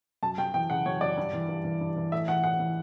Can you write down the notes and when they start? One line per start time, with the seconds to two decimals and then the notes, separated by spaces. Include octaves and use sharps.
0.23 F#2 A5
0.38 F#2 G5
0.54 E3 G5
0.70 C#3 F#5
0.86 F#2 C#5
1.01 F#2 D5
1.17 G2
1.33 E3
1.49 G2
1.65 E3
1.81 G2
1.96 E3
2.12 A2 E5
2.28 E3 F#5
2.44 A2 F#5
2.60 E3